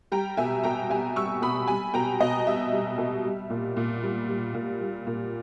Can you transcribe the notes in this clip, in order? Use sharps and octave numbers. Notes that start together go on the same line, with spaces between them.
G3 G5 A#5
B2 E5 G#5
B2 G5 A#5
G3 E5 G#5
G3 C#6 E6
B2 B5 D#6
G3 G#5 B5
B2 G5 A#5
B2 D#5
G3 E5
G3
B2
G3
A#2
A#2
G3
G3
A#2
G3
A#2